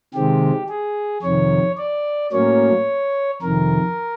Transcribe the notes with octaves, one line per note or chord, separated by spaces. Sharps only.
C3 D#3 G#3 C4 G4
G#4
F2 C3 D#3 C#5
D5
A2 F#3 A#3 C#4 C#5
F2 C3 D#3 A#4